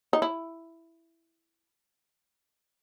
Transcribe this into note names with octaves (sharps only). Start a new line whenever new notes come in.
D#4
E4